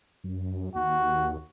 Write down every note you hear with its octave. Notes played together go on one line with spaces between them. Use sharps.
F#2
D#2 F#4